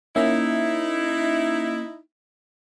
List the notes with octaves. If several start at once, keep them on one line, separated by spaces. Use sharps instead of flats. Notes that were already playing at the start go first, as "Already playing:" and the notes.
A#3 C#4 D#4 E4 E5